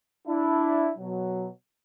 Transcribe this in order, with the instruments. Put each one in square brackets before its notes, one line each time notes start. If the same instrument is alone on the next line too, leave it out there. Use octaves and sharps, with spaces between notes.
[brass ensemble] D4 E4
B2 F#3